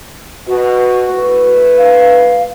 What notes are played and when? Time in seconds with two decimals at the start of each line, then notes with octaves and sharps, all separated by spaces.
0.47 B2 F#4
1.09 A3 E4 B4
1.78 F5